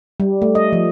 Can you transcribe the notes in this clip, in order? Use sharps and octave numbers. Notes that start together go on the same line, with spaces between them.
G3
A3
D#5
F3